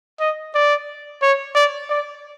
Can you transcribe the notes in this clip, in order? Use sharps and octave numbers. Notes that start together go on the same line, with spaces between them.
D#5
D5
C#5
D5
D5